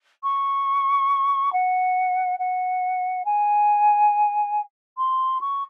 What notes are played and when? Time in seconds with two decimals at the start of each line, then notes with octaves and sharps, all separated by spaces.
0.23 C#6
1.53 F#5
2.39 F#5
3.25 G#5
4.98 C6
5.41 C#6